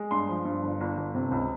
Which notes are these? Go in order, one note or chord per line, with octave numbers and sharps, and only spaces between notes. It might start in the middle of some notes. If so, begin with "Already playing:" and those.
Already playing: G#3
G2 C6
F3
G2
G1
G1
G1
C3
C#2